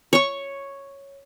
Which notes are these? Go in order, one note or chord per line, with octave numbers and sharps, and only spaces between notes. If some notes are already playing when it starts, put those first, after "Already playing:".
C#5 C#6